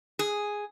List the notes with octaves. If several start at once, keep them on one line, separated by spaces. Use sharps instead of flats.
G#4